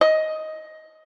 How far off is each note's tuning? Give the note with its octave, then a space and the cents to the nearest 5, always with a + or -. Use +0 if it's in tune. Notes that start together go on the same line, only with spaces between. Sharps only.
D#5 +10